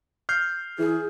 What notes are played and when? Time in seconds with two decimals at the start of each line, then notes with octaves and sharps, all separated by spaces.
0.29 F6 G6 C7
0.79 E3 G#4